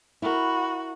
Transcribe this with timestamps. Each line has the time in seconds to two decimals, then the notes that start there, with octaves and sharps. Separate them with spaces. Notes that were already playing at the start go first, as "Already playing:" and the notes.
0.22 E4 F#4 A#4